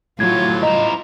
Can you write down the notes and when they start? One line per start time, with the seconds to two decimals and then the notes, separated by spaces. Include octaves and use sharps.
0.20 A2 F#3 F4 G#6
0.63 E4 C5 D#5 A#5